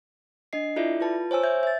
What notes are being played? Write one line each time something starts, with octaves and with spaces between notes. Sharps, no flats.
D4 D#5 C7
E4 F4 A4 D5 E5
F4 B4 A5
C5 C#5 G#5 E6
E5 G6 G#6
E5 A6